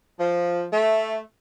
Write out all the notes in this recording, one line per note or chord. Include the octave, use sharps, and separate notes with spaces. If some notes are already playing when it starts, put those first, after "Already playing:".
F3
A3